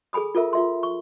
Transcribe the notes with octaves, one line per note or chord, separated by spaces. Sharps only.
G#4 A4 G#5 B5 D#6
F4 A4 A#4 E5
F4 E5 C6
C#6